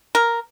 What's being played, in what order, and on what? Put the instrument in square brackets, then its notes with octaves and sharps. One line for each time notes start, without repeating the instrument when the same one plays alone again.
[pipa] A#4